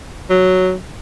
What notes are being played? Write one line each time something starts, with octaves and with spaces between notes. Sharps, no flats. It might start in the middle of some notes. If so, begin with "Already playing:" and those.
F#3